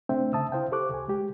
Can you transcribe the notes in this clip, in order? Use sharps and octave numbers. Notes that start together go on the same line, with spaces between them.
A3 C4 D4 C5 E5 G5
C#3 E5 A5 D#6 E6
E4 C5 F5 G5
G4 A4 C5 C#6 D6 F#6
C#2 G#5
G#3 G4